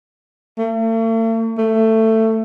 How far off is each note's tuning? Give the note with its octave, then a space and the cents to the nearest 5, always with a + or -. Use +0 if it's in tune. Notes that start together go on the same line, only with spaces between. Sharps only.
A3 +45
A3 +15